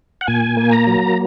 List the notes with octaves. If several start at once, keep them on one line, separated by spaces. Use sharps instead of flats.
F#5
A#2 G#5
A#3
A#5
F#3